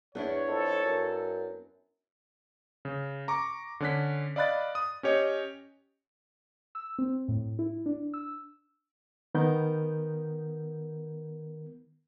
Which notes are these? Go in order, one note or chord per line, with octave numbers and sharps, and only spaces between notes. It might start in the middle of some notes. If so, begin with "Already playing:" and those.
E2 B3 D4 E4 C#5
F2 A4
F#2
C#3
A#5 C#6 D6
D3 C#4 F#6 B6
D5 D#5 F5 B5 F#6 A6
D#6
C#4 G4 C#5 D#5
E6
C4
A2
E4
D4
E6
D#3 B3 A#4 G6